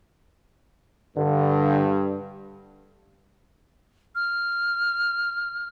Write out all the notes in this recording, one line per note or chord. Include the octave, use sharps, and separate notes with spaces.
G2 D3
F6